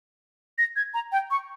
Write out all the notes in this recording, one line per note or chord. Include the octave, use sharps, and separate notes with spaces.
A#6
G#6
A#5
G5
C#6